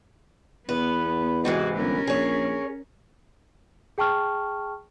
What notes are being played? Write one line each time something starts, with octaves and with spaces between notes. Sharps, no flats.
E2 B3 B4
G#2 C3 E3 F#4 G#4
G1 C#4 A#4
A#1 G#4 C#5
G#4 G5 A5 C#6 F6